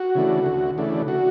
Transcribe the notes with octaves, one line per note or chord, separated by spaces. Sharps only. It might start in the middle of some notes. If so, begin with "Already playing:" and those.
Already playing: F#4
C#3 E3 A3 D4
D2
C#3 E3 A3 D4
F#4